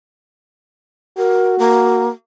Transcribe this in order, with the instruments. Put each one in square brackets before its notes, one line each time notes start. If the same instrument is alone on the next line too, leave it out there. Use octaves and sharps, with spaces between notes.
[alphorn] F#4 [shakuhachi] A#4
[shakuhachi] A#3